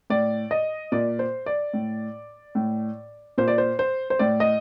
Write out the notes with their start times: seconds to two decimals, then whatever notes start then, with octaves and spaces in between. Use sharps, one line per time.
0.10 A2 D5
0.51 D#5
0.92 A#2 D5
1.19 C5
1.46 D5
1.73 A2
2.55 A2
3.38 A#2 C5
3.48 D5
3.58 C5
3.79 C5
4.10 C5
4.19 A2 D5
4.40 D#5